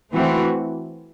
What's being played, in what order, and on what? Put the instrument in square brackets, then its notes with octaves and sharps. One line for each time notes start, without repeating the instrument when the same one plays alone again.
[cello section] E3 A3 C4 F#4